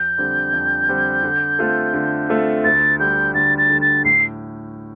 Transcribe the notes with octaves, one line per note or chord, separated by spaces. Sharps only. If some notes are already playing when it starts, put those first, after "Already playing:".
Already playing: F2 G6
D3 G3 C4
F2
D3 G3 C4
D3
A3 C4 F4 A4
D3
A3 C4 F4 A4
D2 A6
D3 G3 G6
D2 A6
A6
D3 G3
A6
A2 C7